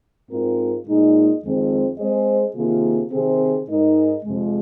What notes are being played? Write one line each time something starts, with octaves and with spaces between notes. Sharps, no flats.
G#2 G#3 C4 F4 A#4
A#2 G#3 D#4 G#4 D#5
F2 D#3 G#3 C4 G#4
G#3 C4 G#4 C5 D#5
C3 D#3 A#3 F4 G#4
C3 D#3 C4 G#4 C5
G#2 G#3 D#4 A#4 D#5
F2 C3 G#3